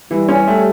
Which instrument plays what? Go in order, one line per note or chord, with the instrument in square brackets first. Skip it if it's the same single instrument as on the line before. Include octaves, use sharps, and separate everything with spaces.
[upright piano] E3 [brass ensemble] G3
[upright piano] C#4
A3